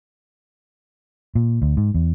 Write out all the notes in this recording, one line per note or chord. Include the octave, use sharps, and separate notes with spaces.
A#2
D2
G#2
E2